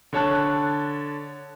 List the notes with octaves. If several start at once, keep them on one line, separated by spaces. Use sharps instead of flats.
D3 C#5 A5 F#6